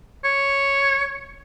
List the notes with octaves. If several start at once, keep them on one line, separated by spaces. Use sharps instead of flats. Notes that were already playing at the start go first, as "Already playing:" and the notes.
C#5